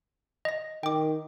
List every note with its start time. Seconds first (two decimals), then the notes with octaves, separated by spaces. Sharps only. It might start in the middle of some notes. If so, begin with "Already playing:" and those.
0.45 D#5 A#6
0.83 D#3 G5 D6